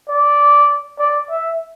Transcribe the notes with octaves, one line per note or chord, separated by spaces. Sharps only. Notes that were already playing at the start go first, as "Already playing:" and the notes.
D5
D5
E5